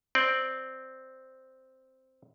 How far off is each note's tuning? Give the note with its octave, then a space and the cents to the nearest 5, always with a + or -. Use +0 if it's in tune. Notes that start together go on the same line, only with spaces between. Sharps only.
C4 +0 D5 +0